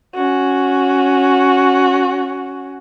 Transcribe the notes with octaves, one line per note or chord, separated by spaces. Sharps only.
C#4 F#4